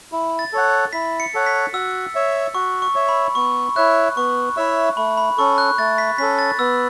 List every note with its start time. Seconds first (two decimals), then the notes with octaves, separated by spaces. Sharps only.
0.12 E4
0.39 A6
0.53 A4 C#5 F#5
0.93 E4 B6
1.20 C#7
1.34 A4 C#5 F#5
1.46 B6
1.73 F#4 E6
2.15 C#5 E5
2.54 F#4 C#6
2.82 C#6
2.95 C#5 E5
3.09 B5
3.35 B3 C#6
3.76 E4 C#5 E5 F#6
4.17 B3 C#6
4.57 E4 C#5 E5
4.97 A3 B5
5.17 B5
5.38 C#4 A4 C#6
5.58 F#6
5.78 A3 A6
5.98 B6
6.18 C#4 A4 B6
6.39 A6
6.59 B3 E6